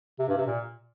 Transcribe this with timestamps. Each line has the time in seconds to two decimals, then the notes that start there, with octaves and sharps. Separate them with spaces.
0.19 C3
0.28 G2
0.37 C3
0.46 A#2